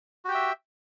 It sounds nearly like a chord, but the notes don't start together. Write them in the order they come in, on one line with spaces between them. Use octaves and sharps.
F#4 G4 G5 E5